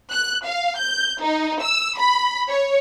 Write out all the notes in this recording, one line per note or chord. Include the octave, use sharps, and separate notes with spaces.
F#6
F5
G6
D#4
E6
B5
C#5